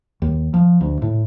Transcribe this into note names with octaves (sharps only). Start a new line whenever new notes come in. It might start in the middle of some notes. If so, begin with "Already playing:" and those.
D#2
F3
D2
A2